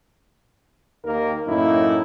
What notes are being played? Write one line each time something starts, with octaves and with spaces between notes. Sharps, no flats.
D#2 D#3 A#3 A#4
F#2 A2 A#3 D#4 E4